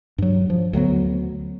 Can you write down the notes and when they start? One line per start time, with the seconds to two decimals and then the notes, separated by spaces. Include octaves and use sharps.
0.18 G2 F#3
0.50 F3
0.73 D2 F#3 G#3 B3